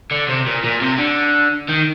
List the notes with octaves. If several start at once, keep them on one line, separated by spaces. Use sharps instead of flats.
D3
C3
A#2
A#2
C3
D3
D#3